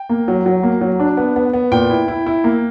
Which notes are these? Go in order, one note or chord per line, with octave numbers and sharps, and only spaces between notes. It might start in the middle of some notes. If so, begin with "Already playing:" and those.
Already playing: G5
A#3
F#3
F#3
A#3
F#3
D4
B3
B3
B3
A#2 G5
E4
E4
E4
A#3